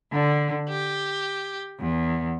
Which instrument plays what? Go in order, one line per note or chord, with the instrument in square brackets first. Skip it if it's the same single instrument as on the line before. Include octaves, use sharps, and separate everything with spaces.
[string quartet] D3
G4
E2